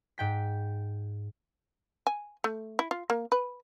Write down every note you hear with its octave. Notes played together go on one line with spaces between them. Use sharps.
G#2 G5 B6
G#5
A3
E4
F4
A#3
B4